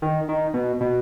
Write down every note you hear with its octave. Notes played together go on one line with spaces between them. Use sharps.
D#3
D#3
B2
B2